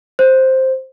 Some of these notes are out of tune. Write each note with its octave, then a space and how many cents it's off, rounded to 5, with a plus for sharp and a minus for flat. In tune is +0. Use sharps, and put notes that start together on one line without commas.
C5 +5